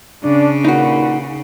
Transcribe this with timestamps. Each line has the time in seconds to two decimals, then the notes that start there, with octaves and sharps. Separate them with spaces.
0.24 C#3 D4
0.64 D#2 A#2 D#4 F#4 B4